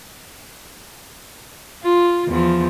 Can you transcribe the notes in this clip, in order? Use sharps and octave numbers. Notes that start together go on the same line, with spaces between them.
F4
E2 F3